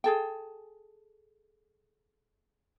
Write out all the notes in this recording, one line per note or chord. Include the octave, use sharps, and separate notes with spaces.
G#4 A4 G5